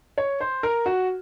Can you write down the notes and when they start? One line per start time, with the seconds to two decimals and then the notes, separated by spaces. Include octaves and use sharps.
0.18 C#5
0.41 C5
0.63 A#4
0.86 F#4